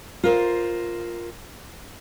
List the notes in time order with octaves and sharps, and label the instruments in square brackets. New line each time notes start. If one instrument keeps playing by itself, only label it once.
[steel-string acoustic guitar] F4 A#4 C5